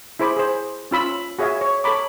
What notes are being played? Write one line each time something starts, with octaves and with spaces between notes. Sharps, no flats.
E4 G#4 C5 B5 D6
G#4 C5
C#4 F4 B5 E6
F#4 G#4 C#5 E5 F5 G#5
C#5
A4 C#5 A#5 B5 D6